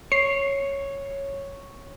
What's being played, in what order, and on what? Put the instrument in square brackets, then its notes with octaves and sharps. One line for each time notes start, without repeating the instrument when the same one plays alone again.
[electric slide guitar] C#5 [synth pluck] C7